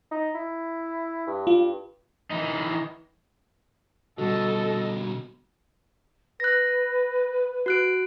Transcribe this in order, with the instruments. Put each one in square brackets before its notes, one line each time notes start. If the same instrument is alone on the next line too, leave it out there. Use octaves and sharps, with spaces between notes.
[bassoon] D#4
E4
G2
[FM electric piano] F4
[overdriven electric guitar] E3 D#4
[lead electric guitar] B2 D3 [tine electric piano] G3 F#4 [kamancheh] A4 D#5
[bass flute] B4 [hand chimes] F#6 A#6
[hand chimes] F#4 F#6 D7